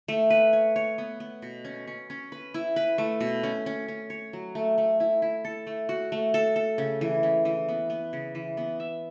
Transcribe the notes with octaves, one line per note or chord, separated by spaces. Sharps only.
A3
B4
C#5
C#5
B3
B3
B2
C#4
C#4
C#4
B4
E4
B4
A3
B2
C#4
C#4
C#4
C#5
F#3
A3
A3
E4
E4
A4
A3
F#4
A3
A4
A4
C#3
E3
C#3
E3
B3
B3
C#3
E3
B3
E5